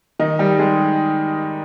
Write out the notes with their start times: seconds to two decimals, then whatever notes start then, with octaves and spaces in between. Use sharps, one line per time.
0.19 D#3 D#4
0.39 G3 G4
0.59 G#3 G#4